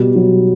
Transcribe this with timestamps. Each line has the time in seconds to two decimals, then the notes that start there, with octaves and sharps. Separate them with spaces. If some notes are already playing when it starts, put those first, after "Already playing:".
Already playing: B2 G3
0.15 F#3